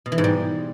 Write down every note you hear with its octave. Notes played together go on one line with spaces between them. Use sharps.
B2
E3
G#2
G3